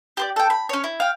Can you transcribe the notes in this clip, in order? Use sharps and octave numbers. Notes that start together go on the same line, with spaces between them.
G4 C5 D5
A4 G5
B5
C#4 C#5
E4
F5 G5